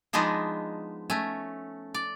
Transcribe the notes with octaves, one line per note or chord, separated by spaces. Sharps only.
F3 G#3 B3 D4 D#4
A3 C#4
D5